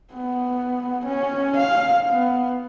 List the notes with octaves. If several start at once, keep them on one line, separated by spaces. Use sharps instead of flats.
B3
C#4
F5
B3